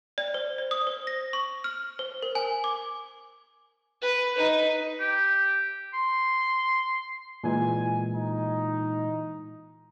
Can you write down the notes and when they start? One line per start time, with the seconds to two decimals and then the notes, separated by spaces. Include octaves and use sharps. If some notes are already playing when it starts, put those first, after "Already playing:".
0.18 D5
0.34 C5
0.58 D5
0.71 D#6
0.87 C5
1.07 A#6
1.33 C#6
1.64 F6
1.99 C5
2.23 A#4
2.35 G#5
2.64 D6
4.02 B4
4.37 D#4 B4
5.00 G4
5.94 C6
7.44 A#2 E3 G#3 G#5
8.14 D#4